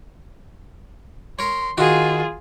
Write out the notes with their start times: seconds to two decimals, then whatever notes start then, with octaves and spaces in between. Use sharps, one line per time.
1.39 A#4 C#5 C6
1.78 D#3 F4 F#4 G#4 D#6